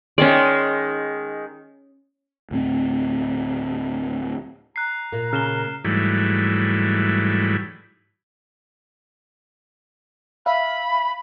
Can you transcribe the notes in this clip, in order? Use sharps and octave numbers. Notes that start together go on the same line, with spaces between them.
D#3 G#3 C#4 D5
D2 A2 G3 C4
A#5 F#6 C7
A#2 A#3
C#3 F6 E7 G7
G#2 E3 F#3 G3 A3
E5 F5 B5